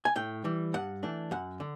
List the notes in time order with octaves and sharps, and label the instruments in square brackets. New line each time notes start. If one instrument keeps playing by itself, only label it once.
[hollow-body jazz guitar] G#5
A2 G5
E3 G3
G2 F#5
E3 A3 D4
F#2 F#5
D3